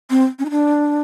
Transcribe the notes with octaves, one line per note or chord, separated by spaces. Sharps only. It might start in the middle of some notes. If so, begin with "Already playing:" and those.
C4
C#4
D#4
D4